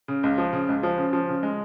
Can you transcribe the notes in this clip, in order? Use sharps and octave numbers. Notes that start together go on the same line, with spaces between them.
C#3
C#2
F3
C#3
C#2
F3
C#3
F3
C#3
G#3